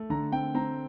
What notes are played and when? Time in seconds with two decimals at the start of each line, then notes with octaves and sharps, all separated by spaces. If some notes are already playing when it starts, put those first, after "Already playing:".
Already playing: A3
0.10 D3 A#5
0.32 C4 G5
0.54 C4 A#5